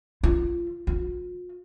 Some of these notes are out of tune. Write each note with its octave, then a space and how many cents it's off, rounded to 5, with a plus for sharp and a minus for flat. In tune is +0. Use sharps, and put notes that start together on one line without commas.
F4 -25
F4 +45